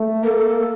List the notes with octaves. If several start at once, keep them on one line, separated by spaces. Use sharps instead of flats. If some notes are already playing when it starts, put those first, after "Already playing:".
Already playing: A3
A#3 A4 A#4